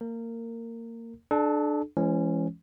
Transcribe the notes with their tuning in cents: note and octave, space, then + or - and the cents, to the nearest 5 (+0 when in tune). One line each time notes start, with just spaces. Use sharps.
A#3 -25 A#4 -20
D4 +20 A4 -35
E3 +40 G#3 +10 C#4 -10